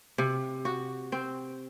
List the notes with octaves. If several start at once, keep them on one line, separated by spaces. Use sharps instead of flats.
C3
F#4
C4